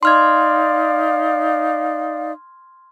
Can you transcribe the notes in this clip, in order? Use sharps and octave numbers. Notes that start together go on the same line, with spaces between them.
D#4 D5 F5 C6 F6 G#6